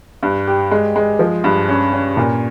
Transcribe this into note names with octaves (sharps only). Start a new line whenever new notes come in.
G2
G4
G#3
G#3
F3
G2
C#4
C#4
A#2